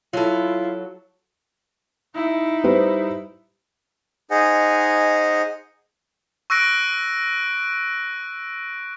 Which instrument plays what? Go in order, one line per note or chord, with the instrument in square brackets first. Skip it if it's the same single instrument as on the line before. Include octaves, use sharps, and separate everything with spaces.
[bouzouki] F#3 A4 [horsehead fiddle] E4 [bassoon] F4
[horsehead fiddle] D#4 E4
[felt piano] G3 B4 C5
[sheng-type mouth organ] D#4 G#4 C5 D#5 F#5 G#5
[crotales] C#6 E6 F#6 A#6 D7